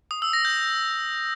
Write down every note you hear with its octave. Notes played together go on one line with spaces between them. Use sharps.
D#6
E6
A#6
G6